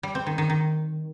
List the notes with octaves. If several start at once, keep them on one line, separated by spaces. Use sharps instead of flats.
G3
C4
D#3
D#3
D#3